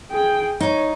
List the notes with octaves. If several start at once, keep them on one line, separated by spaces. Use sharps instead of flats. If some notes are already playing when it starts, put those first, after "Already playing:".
G#4 G5
D#4 C#5